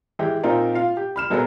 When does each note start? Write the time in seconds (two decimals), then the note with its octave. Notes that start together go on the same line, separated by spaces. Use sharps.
0.19 E3 G#3 G4
0.43 A#2 C4 D#4 F4 A#4
0.75 F4 F5
0.97 G4
1.16 B5 F6 E7
1.30 A#2 F#3 G#3 B3 A4 A#4